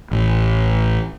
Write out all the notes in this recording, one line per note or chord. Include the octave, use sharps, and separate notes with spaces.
A1